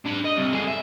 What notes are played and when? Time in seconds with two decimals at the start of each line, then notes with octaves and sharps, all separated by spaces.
0.05 D4 B5
0.24 D#5
0.36 C2
0.52 D3 G#4
0.67 E5